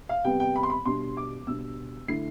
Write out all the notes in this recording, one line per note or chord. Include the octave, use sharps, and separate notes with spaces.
F5
C3 G3 B3 G5
G5
B5
C6
B5
B2 G3 D4 C6
D6
B2 G3 D4 E6
D3 A3 E4 C7